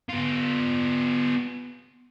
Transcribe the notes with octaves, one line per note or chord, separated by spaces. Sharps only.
B3 F4